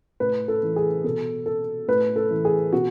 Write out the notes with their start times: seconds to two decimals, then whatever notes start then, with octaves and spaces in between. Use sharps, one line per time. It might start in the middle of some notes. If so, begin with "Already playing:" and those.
0.20 A2 B4
0.48 A4
0.63 E3
0.76 G#4
1.04 B2 A4
1.46 A4
1.88 A2 B4
2.16 A4
2.31 E3
2.45 G#4
2.73 B2 F#4